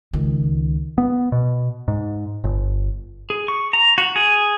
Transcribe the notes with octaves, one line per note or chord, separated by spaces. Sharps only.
C#2 D#3
B3
B2
G#2
G1
G#4
C#6
A#5
F#4
G#4